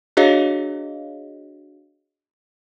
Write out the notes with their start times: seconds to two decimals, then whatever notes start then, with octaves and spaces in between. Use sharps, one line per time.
0.17 D4 F#4 G#4 C#5 D#5 F5